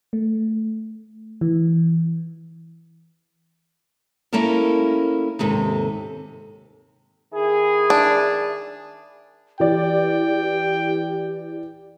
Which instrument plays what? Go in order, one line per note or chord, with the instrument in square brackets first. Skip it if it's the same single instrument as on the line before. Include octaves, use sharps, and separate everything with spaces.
[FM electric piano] A3
E3
[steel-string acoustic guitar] A#3 C#4 E4 A4 A#4
D#2 G#2 C3 A4
[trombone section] D#3 E4 G#4
[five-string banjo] D4
[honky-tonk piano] E3 D5 [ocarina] G4 [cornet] G5